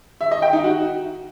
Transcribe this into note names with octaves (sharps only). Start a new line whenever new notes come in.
E5
D#5
G5
D#4
F#4